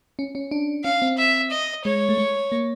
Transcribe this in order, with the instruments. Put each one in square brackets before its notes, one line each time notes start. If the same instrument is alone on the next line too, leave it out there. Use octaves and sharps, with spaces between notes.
[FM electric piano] C#4
C#4
D4
[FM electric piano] C#4 [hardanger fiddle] F5
[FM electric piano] C4
[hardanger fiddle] E5
D#5
[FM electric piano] G#3 [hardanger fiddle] C#5
[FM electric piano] A3
G#3
A#3